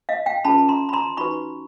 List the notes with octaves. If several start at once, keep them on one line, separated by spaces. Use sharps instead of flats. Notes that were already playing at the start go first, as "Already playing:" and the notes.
D#5 F5
F5 G5
C#4 F4 G#4 B4 A5 B5
A#5 C6
B5
A#5 C6
D#4 F#4 B4 B5 C#6